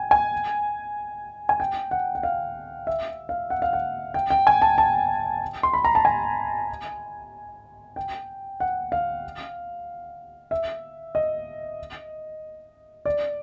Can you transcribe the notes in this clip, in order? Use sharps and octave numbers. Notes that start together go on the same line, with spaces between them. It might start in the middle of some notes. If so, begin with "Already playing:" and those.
Already playing: G5 G#5
G#5
G#5
G5
F#5
F#5
F5
E5
F5
F#5
F5
F#5
G5
G5
G#5
A5
A5
C6
B5
A#5
A5
G#5
G5
F#5
F5
E5
D#5
D5